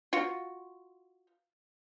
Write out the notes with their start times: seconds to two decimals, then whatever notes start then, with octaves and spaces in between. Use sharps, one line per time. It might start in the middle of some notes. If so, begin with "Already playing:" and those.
0.13 F4 F#4